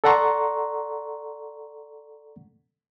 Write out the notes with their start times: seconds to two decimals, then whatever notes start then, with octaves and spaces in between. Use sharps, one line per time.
0.04 A4 D5 F#5 A#5 C6 C#6